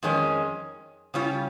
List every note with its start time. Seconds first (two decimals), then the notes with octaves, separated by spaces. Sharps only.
0.03 F2 D#3 G#3 C#4
1.14 C#3 G3 C#4 F4